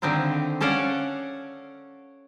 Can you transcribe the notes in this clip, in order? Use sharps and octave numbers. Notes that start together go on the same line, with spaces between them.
D3 D#3 C4 E4 F4
C#4 A4 C#5 D5 F5 F#5